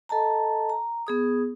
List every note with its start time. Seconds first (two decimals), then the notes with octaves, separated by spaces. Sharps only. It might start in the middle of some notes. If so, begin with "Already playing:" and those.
0.09 A4 D#5 A5 A#5
0.70 A#5
1.07 B3 G#4 D#6